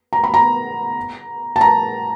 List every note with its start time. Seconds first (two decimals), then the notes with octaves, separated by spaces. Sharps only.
0.13 A#5
0.24 B5
0.34 A#5
1.56 A5
1.61 A#5